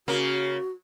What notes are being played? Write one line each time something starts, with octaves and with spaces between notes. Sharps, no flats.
C#3 A#3 F#4